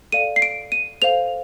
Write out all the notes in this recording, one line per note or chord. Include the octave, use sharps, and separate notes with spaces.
A4 D5 F5 D#7
C7
D7
D#7
A4 C5 F5 F7